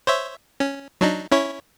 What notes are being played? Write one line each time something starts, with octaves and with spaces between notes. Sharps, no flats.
C5 C#5 E5
C#4
F#3 D4 D#4
C#4 E4 C#5